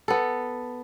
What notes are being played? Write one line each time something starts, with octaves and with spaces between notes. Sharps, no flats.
B3 A4